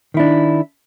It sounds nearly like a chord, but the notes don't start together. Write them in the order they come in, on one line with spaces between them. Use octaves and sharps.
D#3 E4 D4